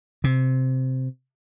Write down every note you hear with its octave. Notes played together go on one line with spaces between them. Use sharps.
C3